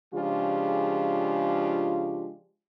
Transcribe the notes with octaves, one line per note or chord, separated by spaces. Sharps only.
C#3 F3 G#3 D4 F4 G4